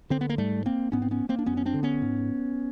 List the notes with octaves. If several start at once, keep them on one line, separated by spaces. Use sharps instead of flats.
D3 C4
B3
A#3
G#2 G3 A3
A#3 C4
G#2 B3 C#4
C4
B3 C#4
A#3 C4
D4
F#2 B3 C#4
C#4
C4 D4
D3
B3 C#4
G#2